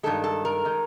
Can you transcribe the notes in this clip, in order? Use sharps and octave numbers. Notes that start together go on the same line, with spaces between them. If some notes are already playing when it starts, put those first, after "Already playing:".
G2 D#3 G#3 A4
A4
A#4
D#3 G#3